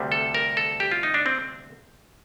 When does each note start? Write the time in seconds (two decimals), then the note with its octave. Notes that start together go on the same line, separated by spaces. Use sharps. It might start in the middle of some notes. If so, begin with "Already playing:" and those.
Already playing: D2 C3 G3
0.12 A4
0.35 A#4
0.57 A4
0.80 G4
0.91 F4
1.03 D#4
1.14 D4
1.26 C4